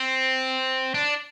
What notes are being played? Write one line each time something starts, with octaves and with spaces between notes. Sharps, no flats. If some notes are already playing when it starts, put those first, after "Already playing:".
Already playing: C4
D4